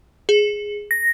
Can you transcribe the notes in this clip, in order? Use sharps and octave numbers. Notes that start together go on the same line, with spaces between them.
G#4
A#6